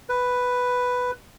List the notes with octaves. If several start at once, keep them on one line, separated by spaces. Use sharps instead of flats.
B4